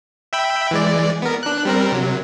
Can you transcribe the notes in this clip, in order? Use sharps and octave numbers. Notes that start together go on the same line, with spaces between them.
E5 G5 B5
E3 G#3 D5
B3 A#4
D4 F#6
G3 C4 A#4
C3 F#3